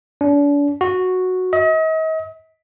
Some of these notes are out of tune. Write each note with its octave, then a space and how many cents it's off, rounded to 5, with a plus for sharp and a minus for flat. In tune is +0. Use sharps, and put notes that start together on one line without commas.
D4 -40
F#4 -5
D#5 +40